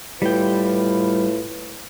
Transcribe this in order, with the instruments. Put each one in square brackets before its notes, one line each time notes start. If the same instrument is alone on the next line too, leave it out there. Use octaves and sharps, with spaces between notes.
[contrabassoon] A2 [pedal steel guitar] G3 G5 [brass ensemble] F4 B4